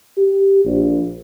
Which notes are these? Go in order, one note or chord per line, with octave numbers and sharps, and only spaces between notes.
G4
A#1